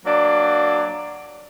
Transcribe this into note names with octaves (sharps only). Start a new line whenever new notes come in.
F#3 A#3 D4 D5